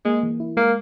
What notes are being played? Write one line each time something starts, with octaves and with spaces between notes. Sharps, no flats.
G#3 A#3
E3
E4
G#3 A#3